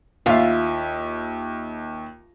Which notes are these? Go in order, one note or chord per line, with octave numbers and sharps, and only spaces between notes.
D#2 F4 E5